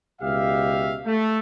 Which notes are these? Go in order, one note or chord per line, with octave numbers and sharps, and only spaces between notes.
C#2 B2 G4 E5 F5
A3